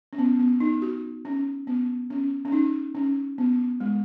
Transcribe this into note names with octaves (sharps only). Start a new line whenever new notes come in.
C#4
B3
B3
D#4
F#4
C#4
B3
C#4
C#4
D#4
C#4
B3
G#3